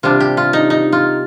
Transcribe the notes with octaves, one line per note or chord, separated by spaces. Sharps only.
C3 G3 D4 F4
G4
F4
D#4
D#4
F4